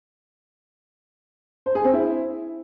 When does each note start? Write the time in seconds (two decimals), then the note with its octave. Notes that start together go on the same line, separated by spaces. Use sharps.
1.66 C5
1.75 G#4
1.84 C4
1.94 E4